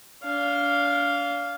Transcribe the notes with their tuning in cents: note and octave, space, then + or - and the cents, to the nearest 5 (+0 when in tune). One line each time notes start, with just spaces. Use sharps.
D4 -40 F5 +0